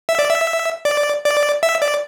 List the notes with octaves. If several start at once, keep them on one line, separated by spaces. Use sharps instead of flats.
E5
D5
E5
D5
D5
E5
D5